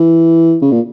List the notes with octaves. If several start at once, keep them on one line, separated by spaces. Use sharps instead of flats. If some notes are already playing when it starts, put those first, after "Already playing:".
Already playing: E3
C#3
A#2